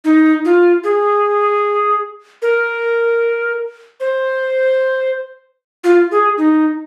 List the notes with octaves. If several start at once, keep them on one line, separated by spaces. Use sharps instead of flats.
D#4
F4
G#4
A#4
C5
F4
G#4
D#4